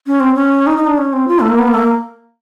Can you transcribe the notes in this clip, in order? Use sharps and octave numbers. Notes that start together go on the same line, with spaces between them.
C#4
C4
C#4
D#4
D#4
D4
C#4
C4
F4
A3
A#3
B3
A#3
A3
A#3